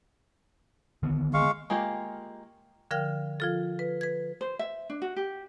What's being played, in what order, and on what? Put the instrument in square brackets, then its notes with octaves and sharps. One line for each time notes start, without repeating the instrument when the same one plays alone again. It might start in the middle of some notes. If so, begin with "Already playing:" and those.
[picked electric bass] D3 D#3 B3
[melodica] G#3 F5 C#6
[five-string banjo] G#3 A#3 F4 G4
[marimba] D3 F3 A#4 F5 G5 F6
F3 F4 A4
B4
B4 G#6
[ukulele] C5
E5
D4
F#4
G4